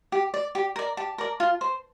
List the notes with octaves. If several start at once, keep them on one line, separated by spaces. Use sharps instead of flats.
G4
D5
G4
A#4 D5
G4 A5
A#4 D5
F4
C5